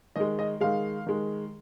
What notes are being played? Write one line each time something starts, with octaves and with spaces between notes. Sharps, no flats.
D#3 G#3 D#5
D#5
D#3 G#3 F5
D#3 G#3